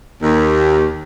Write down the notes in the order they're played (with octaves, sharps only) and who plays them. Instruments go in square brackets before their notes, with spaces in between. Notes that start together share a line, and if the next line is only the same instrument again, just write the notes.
[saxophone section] D#2